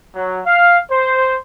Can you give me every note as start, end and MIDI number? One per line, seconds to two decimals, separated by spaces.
0.14 0.40 54
0.46 0.78 77
0.90 1.37 72